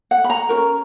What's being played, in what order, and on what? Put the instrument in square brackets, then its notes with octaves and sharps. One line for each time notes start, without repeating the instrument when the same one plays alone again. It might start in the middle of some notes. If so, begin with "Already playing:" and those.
[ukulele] F#5
B5
A#5
C#4 F#4 A#4